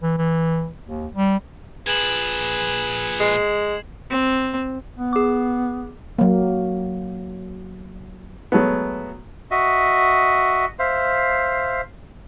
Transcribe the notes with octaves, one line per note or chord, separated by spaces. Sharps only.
E3
E3
D#2
G3
A#2 F3 G#4 B4 G#6 E7 F#7
G#3 C7
C4
B3
G#4 D6
F#3 A#3
F#3 G#3 A3 B3
F#4 D#5 E5
C5 E5 F5